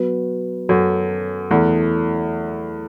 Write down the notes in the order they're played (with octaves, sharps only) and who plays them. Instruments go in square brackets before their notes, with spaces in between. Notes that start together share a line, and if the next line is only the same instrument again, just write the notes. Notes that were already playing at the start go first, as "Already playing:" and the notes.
Already playing: [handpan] F#3 B3 F#4 B4
[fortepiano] F#2 [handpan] F#3 C#4 A4
[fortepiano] E2 [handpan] A3 E4 A4